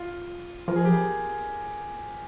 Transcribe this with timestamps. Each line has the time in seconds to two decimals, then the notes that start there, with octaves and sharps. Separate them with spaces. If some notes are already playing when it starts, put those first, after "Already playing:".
Already playing: F4
0.68 F3 A#4
0.76 G#4
0.85 G4
0.93 G#4